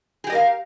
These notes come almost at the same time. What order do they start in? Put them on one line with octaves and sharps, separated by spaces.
G#4 G4 D#5 A#4 F5